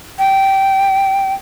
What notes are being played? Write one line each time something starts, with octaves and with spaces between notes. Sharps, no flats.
G5